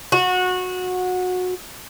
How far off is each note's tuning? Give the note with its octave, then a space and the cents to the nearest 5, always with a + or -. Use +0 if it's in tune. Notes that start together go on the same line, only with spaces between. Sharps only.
F#4 -20